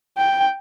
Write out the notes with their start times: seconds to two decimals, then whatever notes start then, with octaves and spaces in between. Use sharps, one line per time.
0.18 G5